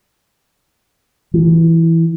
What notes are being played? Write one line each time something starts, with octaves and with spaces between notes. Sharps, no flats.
E3